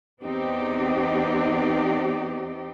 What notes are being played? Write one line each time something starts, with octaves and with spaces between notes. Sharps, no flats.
E2 B3 C4 D#4 G4 D5